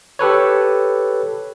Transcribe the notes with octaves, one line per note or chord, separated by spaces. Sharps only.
G4 A4 B4 C#5